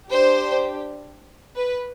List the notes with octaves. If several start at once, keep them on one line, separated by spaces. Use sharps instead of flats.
D4 G4 C5
B4